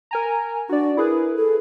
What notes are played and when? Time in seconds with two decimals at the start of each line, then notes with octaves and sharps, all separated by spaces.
0.11 A#4 G#5 A#5
0.69 D4 F#4 D5
0.97 E4 G#4 A#4 B4
1.36 A4